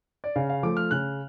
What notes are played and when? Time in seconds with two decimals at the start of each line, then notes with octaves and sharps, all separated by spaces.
0.24 D5
0.36 C#3 F5
0.49 F5
0.63 F3 A3 D6
0.77 F6
0.91 C#3 F#6